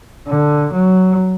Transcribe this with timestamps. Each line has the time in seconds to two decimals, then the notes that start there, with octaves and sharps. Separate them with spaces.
0.28 D3
0.73 F#3